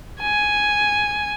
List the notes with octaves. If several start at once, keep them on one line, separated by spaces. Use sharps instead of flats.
G#5